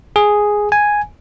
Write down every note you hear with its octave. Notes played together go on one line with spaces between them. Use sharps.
G#4
G#5